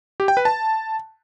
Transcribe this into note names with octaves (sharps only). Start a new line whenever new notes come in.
G4
G5
B4
A5